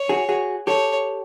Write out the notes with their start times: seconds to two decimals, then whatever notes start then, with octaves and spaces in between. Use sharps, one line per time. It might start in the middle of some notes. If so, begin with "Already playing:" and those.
Already playing: C#5
0.09 F#4 G#4
0.29 F#4 G#4
0.67 G4 A4 C#5